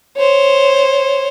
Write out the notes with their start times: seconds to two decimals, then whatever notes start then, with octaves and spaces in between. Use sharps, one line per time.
0.17 C5 C#5